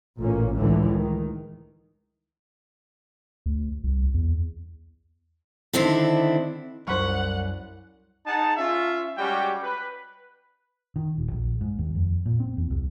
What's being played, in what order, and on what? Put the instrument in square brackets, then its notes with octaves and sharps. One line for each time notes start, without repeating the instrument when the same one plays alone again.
[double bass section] A1 A#2 A#3 C#4
C#2 A2 D3 E3
D#3
[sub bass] D2
C2
E2
[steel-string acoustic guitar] D3 D#3 C4 D4 E4
[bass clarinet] C2 [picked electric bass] F#2 F#3 [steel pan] C5 B5 C#6 [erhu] F#5
[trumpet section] D#4 G#4 F#5 A5
C#4 F4 E5
G3 G#3 C#4 F#4 G4 G5
B4
[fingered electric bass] D#3
D#1
A#1
G#2
D#2
F2
A#2
C4
E2
C2